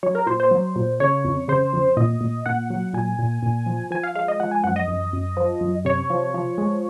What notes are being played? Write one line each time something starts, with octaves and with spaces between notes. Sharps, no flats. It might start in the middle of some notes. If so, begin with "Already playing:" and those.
F#3 C#5
A#4
A#2 C5
C5
F#3
A#2
C#3 C#5
F2
C#3 C5
F2
A#2 D#5
A#2
A#2 F#5
F#3
A#2 G#5
A#2
A#2
F3
F3 G#5
F5
G#3 F5
D#5
F3 F#5
G#5
F#2 F#5
D#5
F#2
F#2
F3
F#2
C3 C#5
F3
F3
G#3